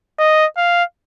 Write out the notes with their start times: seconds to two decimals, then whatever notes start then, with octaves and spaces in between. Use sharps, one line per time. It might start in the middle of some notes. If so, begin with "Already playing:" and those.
0.19 D#5
0.57 F5